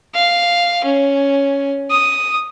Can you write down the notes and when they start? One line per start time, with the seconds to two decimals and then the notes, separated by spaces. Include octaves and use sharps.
0.15 F5
0.84 C#4
1.90 D#6